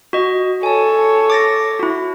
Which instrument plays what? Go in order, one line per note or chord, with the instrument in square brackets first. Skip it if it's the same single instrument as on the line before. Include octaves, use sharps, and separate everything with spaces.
[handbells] F#4 D#5
[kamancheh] A4 C#5 [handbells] G#5 A5
[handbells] D6 A6 A#6
E4 F#4